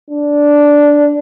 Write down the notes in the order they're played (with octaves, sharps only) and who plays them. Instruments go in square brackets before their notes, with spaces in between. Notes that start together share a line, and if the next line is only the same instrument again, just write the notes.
[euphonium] D4